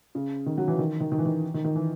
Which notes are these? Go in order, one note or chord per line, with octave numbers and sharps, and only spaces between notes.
C#3
D#3
F#3
E3
D#3
D#3
D#3
E3
D#3
D#3
D#3
E3